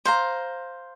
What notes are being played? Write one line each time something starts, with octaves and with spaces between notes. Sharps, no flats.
C5 F5 A#5